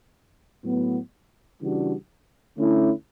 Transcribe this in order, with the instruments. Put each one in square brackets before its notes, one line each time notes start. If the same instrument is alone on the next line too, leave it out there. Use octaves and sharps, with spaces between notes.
[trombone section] A2 F#3 B3
C#3 E3 G3 D4 F#4
D3 A3 C#4 E4